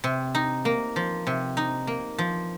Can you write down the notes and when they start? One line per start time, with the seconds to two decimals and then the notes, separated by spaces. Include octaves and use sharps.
0.04 C3
0.35 D#4
0.65 A#3
0.96 F3
1.27 C3
1.57 D#4
1.87 A#3
2.18 F3